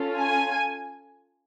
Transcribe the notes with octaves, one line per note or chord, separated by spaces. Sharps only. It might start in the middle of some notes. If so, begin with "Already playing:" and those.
Already playing: C#4 F4 A4
G#5